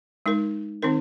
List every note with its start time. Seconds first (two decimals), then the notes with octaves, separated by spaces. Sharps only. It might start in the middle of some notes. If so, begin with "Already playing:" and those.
0.26 G#3 D#4 A#4
0.82 D#3 C4 D#4 A#4